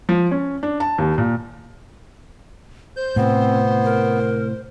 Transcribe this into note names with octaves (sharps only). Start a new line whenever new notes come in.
F3
C#4
D4
A5
D#2
A#2
C5 G6
A2 C3 B3 C4
A#4